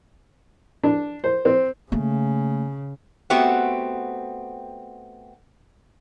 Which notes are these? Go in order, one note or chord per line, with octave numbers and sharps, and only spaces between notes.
D4
C5
C4
C#3 A3 A#3
A3 B3 C4 F#4 G4 F#5